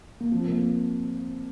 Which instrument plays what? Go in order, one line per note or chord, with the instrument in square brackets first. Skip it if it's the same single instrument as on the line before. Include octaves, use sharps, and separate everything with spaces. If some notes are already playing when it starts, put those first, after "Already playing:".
[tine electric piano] A#3
[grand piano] F3 [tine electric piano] C4
[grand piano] A#3